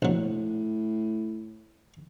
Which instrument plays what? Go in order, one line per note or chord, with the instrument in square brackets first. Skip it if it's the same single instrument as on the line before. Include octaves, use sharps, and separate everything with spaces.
[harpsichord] A#1 F#3 [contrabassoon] A2